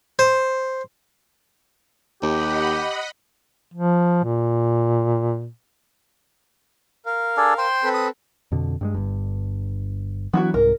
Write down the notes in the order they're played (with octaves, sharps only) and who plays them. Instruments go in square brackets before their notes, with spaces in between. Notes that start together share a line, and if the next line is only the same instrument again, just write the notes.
[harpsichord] C5
[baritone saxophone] D#2 [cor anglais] G4 [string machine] D#5 F#5 B5
[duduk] F3
A#2
[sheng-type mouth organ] A#4 F5
[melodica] D4 G#4 A4
C5 G5 C6
[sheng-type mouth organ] C4 A4 B4
[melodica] D#6
[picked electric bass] F2 B2 D3
G2 G3 G#3
G1 G2
[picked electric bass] E3 F#3 D4 [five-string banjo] B3 E4 F#4
[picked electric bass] C2 G#2 [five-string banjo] A#4